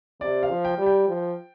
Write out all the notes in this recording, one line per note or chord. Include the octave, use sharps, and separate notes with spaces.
C3 D5
F5
F3
G5
G3
G5
F3